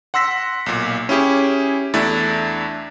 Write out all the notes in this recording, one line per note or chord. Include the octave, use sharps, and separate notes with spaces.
F#5 C6 E6 A#6 B6
B1 A#2
C#4 E4 G4 G#4
E2 A3 D4 E4 A6